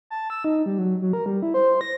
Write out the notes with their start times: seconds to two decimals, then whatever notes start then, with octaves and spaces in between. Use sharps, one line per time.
0.10 A5
0.30 E6
0.44 D#4
0.66 G3
0.78 F#3
1.02 F#3
1.13 A#4
1.26 G3
1.42 E4
1.54 C5
1.81 A#6